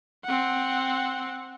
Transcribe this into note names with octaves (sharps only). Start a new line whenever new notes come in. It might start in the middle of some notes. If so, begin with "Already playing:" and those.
C4 F#5